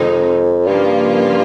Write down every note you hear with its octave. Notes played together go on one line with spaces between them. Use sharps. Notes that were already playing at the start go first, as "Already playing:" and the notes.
Already playing: F2 C3 D#3 G#3 C4 D#4
G2 C#3 F3 A#3 F4